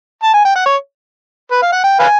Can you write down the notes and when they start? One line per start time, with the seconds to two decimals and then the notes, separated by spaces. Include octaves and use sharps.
0.23 A5
0.34 G#5
0.45 G5
0.55 F#5
0.65 C#5
1.51 B4
1.62 F5
1.73 F#5
1.84 G5
1.99 B4 F5 G#5